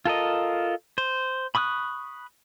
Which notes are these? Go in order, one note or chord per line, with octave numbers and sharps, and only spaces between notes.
F4 A4 A#4 D#5
C5
B5 C#6 D#6 E6 F#6